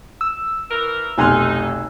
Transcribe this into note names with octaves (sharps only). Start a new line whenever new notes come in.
E6
E3 A#4
F1 B1 D#4 G#5 C6 F6 F#6